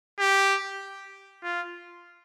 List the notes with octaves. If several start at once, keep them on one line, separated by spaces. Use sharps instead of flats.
G4
F4